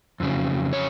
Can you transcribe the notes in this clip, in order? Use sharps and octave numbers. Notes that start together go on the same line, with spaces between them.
F2 C#3 F#3
C#5